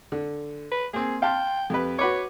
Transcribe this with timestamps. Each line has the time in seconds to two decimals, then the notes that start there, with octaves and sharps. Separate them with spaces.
0.12 D3
0.72 B4
0.94 A#3 C4 G#4
1.22 F5 G5 A5 C6
1.70 F2 G4 B4
1.99 F#4 B4 C#5 D6